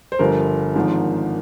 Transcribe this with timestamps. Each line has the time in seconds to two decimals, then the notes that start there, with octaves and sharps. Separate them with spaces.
0.12 C5
0.19 G1 G2 F3 A#4
0.75 G#1 G#2 F3